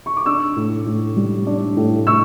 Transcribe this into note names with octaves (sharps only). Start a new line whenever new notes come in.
C#6
D6
D4 C#6 E6
A2
A2
G3
D4
A2
A2 C#6 E6